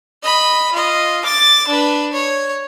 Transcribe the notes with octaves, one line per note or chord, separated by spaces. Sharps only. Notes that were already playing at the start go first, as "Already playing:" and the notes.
D#5 B5
F4 D#5
D6 A6
D4 B4
C#5